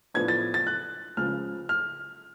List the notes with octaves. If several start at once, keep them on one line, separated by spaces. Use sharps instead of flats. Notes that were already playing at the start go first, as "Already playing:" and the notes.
A2 F3 B3 D4 G#6
A6
A6
F#6
C#2 C#3 F3 F6
F6